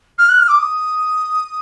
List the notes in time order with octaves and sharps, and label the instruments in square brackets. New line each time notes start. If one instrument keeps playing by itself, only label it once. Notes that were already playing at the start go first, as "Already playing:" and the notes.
[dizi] F6
F#6
F6
D6
D#6